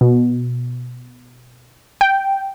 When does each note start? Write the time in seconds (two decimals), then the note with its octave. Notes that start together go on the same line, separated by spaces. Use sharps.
0.01 B2
2.01 G5